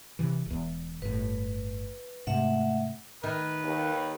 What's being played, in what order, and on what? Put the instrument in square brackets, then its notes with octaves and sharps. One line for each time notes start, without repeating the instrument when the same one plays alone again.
[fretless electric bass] C3 E3
E1 E2
[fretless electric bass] G1 A2 [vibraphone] B4
[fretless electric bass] G#2 C3 [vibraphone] A3 E5 F#5
[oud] D#3 [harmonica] B4
[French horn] D#2